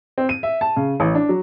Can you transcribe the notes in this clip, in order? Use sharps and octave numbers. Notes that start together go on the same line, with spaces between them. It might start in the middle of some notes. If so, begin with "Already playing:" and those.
C4
D#7
E5
A5
C#3
A1
D4
F#3